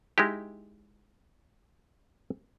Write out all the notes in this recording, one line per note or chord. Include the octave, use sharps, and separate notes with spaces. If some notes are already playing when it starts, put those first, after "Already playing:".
G#3 D#4 E4 G4